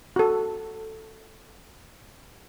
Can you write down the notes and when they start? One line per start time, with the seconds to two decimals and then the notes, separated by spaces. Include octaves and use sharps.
0.16 F#4 A4